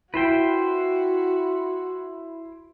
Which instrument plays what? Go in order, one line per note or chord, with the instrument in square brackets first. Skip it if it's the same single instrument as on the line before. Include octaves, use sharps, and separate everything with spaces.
[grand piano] E4 [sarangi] F#4 [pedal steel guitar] B4 C5 G5